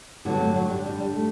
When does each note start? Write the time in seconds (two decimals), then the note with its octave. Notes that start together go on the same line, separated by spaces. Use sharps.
0.25 G2 D3 F#3 B3
0.40 A3
0.56 F#3
0.70 G3
0.86 G3
1.00 G3
1.16 A3